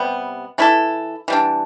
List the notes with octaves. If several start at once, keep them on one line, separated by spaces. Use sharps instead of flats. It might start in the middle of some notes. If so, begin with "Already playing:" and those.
Already playing: C3 G3 B3
E3 A3 E4 A4
E3 G3 D4